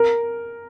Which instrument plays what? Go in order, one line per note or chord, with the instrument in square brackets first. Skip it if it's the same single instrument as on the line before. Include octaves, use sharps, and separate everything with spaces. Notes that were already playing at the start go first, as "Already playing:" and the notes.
Already playing: [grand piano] A#4